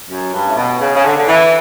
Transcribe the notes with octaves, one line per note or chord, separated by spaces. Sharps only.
F#2
G2
A2
B2
C#3
C#3
D3
D3
E3